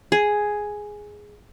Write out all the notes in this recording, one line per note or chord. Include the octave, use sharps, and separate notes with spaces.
G#4